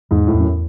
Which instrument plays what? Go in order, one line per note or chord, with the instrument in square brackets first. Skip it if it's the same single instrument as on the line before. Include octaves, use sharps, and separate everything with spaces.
[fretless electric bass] E2 [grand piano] G#2
[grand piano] A2
[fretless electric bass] E2
[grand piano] F#2